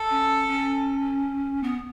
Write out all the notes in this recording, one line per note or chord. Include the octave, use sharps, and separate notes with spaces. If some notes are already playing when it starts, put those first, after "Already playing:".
Already playing: A4
C#4
C#4
B3